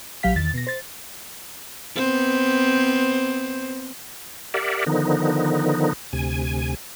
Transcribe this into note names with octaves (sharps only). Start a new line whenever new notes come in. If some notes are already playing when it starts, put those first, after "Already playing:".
A#1 F#3 G4 F5 B6
E2 D#3 A6
B2 A#6
C5 A6
B3 C4 C5
G4 A#4 D5 E5 F#5
D3 D#3 F3 B3 D#4
D2 C3 G#5